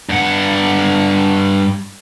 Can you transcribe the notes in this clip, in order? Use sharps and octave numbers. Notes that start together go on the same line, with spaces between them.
G2 F#5